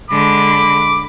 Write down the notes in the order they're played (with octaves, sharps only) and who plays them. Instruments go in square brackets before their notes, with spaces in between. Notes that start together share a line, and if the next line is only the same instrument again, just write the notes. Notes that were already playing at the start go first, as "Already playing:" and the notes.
[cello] D3 G#3 [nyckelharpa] B5 [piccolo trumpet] D6